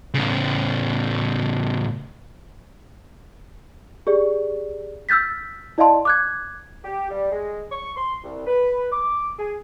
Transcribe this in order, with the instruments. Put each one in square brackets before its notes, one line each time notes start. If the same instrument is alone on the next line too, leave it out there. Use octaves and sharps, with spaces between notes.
[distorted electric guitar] A2 C#3
[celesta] G4 G#4 D5
E6 F6 G6 A6 B6
E4 D5 D#5 F5 A5 C6
D6 F#6 G#6
[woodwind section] G4
G3
G#3
C#6
C6
C2
B4
D6
G#4